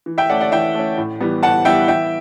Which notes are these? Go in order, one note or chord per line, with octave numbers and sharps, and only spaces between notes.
E3
E5 G5
A3 C#4 D5 F#5
D5 F#5
E3 E5 G5
A3 C#4
A2
E3 G3 B3
A2 F#5 A5
E3 G3 B3 E5 G5
E3 E5 G5